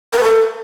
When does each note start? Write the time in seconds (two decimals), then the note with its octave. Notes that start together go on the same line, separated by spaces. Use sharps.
0.13 A#4
0.18 B4
0.23 A4